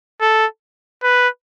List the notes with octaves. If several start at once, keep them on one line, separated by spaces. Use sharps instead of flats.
A4
B4